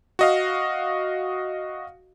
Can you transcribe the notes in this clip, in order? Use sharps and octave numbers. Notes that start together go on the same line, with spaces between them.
F#4 D#5 F5